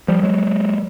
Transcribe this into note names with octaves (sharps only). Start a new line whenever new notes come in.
F3 G3
F#3 G#3